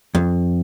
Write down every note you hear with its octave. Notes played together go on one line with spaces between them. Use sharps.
F2